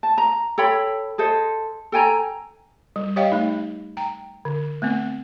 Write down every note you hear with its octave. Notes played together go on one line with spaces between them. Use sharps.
A5
A#5
A4 C#5 G5 B5
G#4 A4 C5 D#5
A4 G5 G#5 A#5
G3
G4 C#5 D#5 F5 G5
A3 D#4
G5 A#5
D3
A3 B3 C4